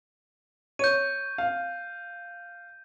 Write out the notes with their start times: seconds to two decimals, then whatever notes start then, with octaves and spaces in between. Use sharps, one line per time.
0.79 C#5 G6 D#7
1.38 F5